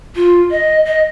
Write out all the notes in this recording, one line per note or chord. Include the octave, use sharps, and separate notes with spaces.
F4
D#5
D#5